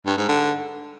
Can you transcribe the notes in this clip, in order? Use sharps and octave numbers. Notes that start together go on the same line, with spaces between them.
G2
G#2
D3